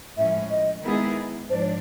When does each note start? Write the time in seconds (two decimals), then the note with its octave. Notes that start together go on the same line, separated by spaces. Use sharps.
0.17 A2 F3 G#3 C#4 E5
0.50 D#5
0.84 D#3 G#3 B3 E4 G#4
1.50 G#2 F3 D4 C5
1.61 C#5